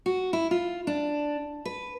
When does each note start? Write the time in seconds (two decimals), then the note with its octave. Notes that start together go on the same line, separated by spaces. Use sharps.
0.06 F#4
0.33 E4
0.51 F4
0.87 D4
1.65 B4